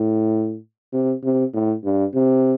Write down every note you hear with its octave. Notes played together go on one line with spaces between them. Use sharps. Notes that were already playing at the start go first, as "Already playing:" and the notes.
Already playing: A2
C3
C3
A2
G2
C3